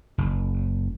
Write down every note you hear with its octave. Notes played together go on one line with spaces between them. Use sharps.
F#1